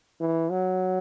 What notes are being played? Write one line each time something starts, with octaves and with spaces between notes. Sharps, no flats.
E3
F#3